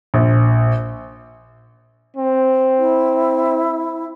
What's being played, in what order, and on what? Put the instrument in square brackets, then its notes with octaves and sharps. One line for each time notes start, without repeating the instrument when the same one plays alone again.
[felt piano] A#1
[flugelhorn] C4
[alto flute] E4